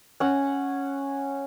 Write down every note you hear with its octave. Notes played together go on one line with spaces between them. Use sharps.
C#4 F#5